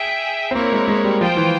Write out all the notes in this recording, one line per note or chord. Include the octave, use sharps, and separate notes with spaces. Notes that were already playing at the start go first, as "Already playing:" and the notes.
Already playing: G#4 E5 G5
C4
A#3 E4 A#4 C#5
G#3
G#3
G3
F3 F4 C5 G5
E3